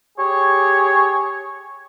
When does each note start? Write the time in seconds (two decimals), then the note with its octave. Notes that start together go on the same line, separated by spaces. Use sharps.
0.18 G4 G#4 C#5